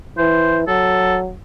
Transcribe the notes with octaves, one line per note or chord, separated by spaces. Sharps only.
E3 C5
F#3 A4